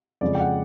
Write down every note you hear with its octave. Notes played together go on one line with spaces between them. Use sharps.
F2 C#3 F3 G#3 D5
G5
F#5